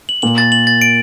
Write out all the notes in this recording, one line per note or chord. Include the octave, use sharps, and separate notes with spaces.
F#7
A#2 F#7
A6
F#7
A6
D7